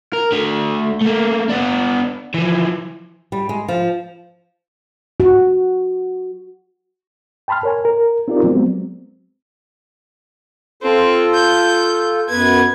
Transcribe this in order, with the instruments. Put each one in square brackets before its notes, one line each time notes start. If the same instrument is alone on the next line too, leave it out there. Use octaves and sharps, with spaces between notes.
[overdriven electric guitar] A#4
A3 D4
A3 A#3
B3 D4
E3 F3
[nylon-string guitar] G3
G#3
F3
[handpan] F#4
[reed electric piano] G5 A5 B5 C6 F6
A#4 C#5 G#5
A#4
C4 D#4 F4 G4 A#4 D5
F#3 G#3 B3 C4
[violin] C4 [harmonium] F4 A4
[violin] G6
[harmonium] F#2 B3 B4 [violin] G#6